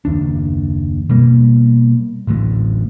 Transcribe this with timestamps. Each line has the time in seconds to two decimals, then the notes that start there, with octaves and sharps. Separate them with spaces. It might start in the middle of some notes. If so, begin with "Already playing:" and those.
0.05 F#1 D#2 D4
1.09 B2 G3 A#3
2.27 D1 A1 D2 A2